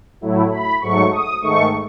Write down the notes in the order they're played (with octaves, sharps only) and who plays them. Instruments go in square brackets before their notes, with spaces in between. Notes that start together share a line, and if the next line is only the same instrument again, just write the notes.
[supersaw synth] A2 F#3 A3 E4
B5
G#2 F#3 A3 C#6
D#6
G#2 D#3 A3 C#6